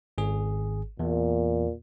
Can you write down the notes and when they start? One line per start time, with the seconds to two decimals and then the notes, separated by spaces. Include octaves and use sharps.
0.18 G#1 G#4
0.99 E2 A#2